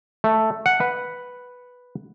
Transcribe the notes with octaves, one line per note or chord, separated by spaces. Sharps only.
A3
F#5
B4